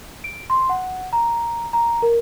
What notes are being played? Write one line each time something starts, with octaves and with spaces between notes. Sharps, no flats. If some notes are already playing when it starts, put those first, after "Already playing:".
D7
C6
F#5
A#5
A#5
A#4